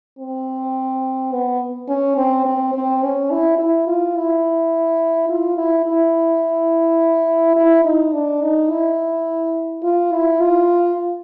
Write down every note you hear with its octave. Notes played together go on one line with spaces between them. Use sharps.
C4
B3
C#4
C4
C4
C4
C#4
E4
E4
F4
E4
F4
E4
E4
E4
D#4
D4
D#4
E4
F4
E4
F4